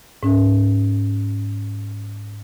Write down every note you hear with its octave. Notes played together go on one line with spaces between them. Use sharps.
G#2 C#4